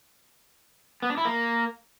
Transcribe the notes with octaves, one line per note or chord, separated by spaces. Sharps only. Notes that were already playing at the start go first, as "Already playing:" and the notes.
B3
D4
E4
A#3